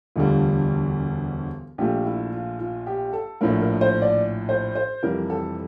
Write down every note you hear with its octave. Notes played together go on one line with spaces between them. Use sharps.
E1 D2 D3 G3 F4
A#1 A#2 A3 G4
E4
F4
F4
G4
A4
A#1 A2 F3 A3 A#4
A#4
C5
D5
C5
C5
F1 F2 E3 G3 A#4
A4